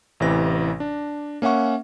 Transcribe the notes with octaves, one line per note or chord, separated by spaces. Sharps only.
A1 C3 E3 A#6
D4
A#3 C#4 E5 F#5 C#6